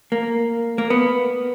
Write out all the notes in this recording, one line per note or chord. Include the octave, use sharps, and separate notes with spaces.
A#3
A#3
B3